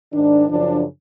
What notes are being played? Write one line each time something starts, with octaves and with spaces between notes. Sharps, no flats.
G#2 D#3 D4
F#2 C#3 F3 D4